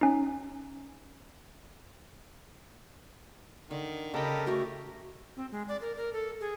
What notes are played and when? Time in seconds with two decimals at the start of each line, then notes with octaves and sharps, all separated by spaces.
0.01 C#4 D#4
3.71 D3 D#3
4.14 C#3 G4 A4 A#4 D#5 G5 B5
4.46 A3 F#4 G4 A#4
5.36 C4
5.52 G#3
5.68 D5
5.81 A#4
5.96 A#4
6.13 A4
6.41 G#4